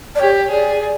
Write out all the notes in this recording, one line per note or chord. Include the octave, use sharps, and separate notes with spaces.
D5
G4 C#5
G#4 D5